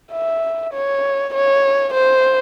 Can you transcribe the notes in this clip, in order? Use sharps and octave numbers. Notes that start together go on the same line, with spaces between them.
E5
C#5
C#5
C5